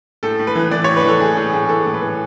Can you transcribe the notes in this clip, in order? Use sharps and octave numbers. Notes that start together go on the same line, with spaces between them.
A2 A4
A2
B4
E3
E3 D5
A2 C#5
B4
E3 A4
A2 G#4
A2 G#4
A2 G#4
E3 A4
A2
B4
E3